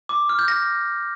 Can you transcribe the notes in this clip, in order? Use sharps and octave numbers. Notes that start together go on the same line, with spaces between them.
D6
F6
G6
A#6